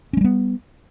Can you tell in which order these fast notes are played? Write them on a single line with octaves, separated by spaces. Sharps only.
C#4 G#3 G3 B3